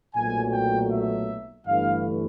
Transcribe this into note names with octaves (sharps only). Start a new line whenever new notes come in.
B1 A#2 F#3 A3 G#5
G5
E5
G1 G2 E3 A3 F5